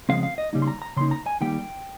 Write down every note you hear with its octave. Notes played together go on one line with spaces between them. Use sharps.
C#3 F3 G#3 C4 F5
F5
D#5
C#3 G3 A#3 D#4
C6
A#5
A#5
C#3 F3 A#3 D#4 C6
A#5
G#5
D#3 G3 A#3 D#4 G5